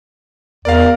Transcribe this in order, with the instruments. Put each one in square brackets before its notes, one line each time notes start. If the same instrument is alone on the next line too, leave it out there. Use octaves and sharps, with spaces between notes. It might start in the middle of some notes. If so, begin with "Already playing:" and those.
[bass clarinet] E2 [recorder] A#4 [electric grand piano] D5 F5